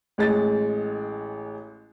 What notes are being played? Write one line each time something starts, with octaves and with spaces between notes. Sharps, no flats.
A1 G#3 A6